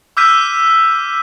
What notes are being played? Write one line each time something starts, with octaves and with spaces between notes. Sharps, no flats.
D6 E6 F6 G6 B6 D#7